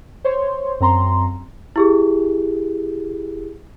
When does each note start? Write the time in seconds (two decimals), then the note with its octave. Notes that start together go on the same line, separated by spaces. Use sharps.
0.24 C5 C#5 C6
0.80 F#2 C4 A#5 C6
1.76 E4 G4 G#4